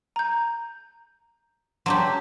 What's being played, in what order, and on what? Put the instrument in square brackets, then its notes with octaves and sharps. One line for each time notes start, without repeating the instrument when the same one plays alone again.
[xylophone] A#5 G6
[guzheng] F#3 D4 G4 [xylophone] C6